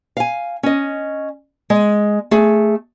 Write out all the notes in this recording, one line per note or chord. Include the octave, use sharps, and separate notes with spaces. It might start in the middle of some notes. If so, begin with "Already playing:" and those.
F5 G#5
C#4 D#5
G#3
A3 G#4